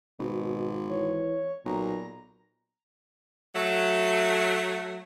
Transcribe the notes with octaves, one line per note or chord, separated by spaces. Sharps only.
G#1 B2
E3 C#5
B1 A#2 A#5
F#3 A3